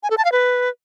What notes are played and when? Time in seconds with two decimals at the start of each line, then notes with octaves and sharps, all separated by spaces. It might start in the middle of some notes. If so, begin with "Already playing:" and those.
0.03 G#5
0.10 A4
0.18 A5
0.25 F5
0.32 B4